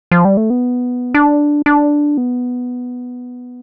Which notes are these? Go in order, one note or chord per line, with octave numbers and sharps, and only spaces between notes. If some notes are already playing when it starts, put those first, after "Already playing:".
F3
G3
A3
B3
D4
D4
B3